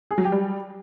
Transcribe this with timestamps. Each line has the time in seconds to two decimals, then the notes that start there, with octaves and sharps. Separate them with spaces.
0.11 G#4
0.18 F#3
0.25 G4
0.32 G3